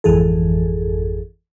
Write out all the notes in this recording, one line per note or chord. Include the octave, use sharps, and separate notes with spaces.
G#1 F2 E3 G#4 A4